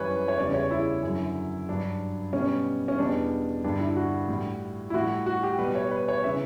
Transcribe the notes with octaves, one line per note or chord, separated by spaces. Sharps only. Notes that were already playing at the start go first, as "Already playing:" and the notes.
Already playing: F#2 E3 G3 B4 C#5
C#5
E2 C#3 G3 D5
C#5
E4
F#2 D3 F#3
G2 F#3 D4
B2 G3 C#4
C#4
E2 B2 G3 D4
G2 D3 G3 D4
E4
F#4
A2 G3
E4
A2 G3 F#4
F#4
G4
B2 G3 B4
C#5
B4
C#5
C#3 E3 E5